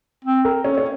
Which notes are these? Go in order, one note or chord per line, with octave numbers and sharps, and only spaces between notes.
C4
A#4
C#4
C#4